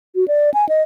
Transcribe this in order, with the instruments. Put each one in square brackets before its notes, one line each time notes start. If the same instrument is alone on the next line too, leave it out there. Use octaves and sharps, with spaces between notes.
[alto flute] F#4
D5
G#5
D#5